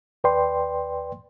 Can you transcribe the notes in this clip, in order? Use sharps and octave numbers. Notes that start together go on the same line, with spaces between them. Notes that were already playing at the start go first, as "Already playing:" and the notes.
D#2 B4 D5 G5 C6